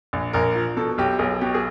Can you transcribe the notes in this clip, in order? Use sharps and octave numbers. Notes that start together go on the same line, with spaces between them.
A#1
A#1 A#4
F3
B2 A4
B1 G4
B1 G#4
B2 G4
G#4